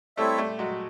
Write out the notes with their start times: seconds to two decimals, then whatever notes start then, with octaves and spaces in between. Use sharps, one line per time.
0.17 G3 A3 C4 E4 A4 C#5 E5
0.38 G3 A3
0.59 F#3 G#3